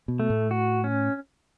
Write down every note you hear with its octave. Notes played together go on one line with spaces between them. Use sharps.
B2
A3
A2
F#4
C#4